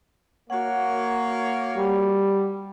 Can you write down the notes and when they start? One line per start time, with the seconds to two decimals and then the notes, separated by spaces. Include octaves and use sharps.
0.50 A#3 F#4 C#5 F#5
1.76 G3